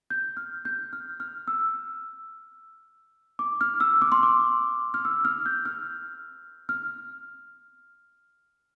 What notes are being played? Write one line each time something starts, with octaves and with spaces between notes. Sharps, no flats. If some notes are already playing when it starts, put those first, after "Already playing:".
G6
F6
G6
F6
F6
E6
D6
F6
E6
D6
C6
D6
F6
E6
F6
G6
F6
F6